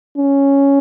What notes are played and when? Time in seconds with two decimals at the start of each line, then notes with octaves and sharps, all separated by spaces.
0.18 C#4